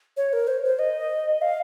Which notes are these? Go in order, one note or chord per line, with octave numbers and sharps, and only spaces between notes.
C#5
A#4
C5
C5
D#5
F5